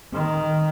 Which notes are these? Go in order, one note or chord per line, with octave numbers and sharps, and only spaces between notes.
D#3